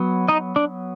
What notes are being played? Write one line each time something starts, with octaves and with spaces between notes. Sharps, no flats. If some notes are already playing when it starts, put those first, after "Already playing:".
Already playing: F#3 B3
D#4 D#5
D4 D5